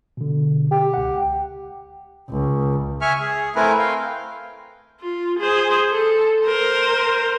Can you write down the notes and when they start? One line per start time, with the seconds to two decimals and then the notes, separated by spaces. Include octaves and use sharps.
0.17 B2 D3
0.71 G4
0.94 C#2 F#5
2.30 C#2
3.01 E5 G#5 C#6 F6
3.20 G#4
3.56 A3 C4 E4 A#4 B4 G#5
3.78 F5 G5
5.01 F4
5.39 G#4 C5
5.91 A4
6.45 A#4 C5